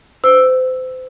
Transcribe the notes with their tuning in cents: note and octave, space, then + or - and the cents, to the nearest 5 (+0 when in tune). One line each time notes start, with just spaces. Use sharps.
C5 -30 E6 +0